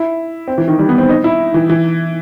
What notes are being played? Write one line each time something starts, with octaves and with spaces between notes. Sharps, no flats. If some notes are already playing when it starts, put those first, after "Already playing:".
Already playing: E4
C4
E3
D#3
G3
B3
C4
D#4
E4
E3
E3